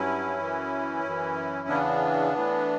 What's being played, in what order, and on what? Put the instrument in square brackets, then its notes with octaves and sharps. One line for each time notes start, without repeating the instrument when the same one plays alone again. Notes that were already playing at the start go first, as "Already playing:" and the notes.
Already playing: [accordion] G2 F#3 C#4 E4
F#2 E3
F#2 E3
E2 C#3 E3 B3 D4
A2 E3